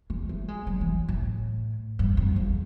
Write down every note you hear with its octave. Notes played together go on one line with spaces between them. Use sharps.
G#3
A3
G#3
F#3
E3
A2
G2
F2
E2